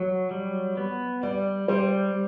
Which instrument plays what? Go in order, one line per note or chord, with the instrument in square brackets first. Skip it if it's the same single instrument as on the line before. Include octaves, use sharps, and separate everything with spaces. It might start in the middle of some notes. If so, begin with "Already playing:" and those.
Already playing: [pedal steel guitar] F#3
G3
B3
[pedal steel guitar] G3 [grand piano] D5
[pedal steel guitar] G3 [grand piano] C5